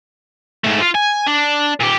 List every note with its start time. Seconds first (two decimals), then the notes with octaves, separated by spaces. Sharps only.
0.64 G#2 A3
0.81 F4
0.95 G#5
1.27 D4
1.80 A#2 G4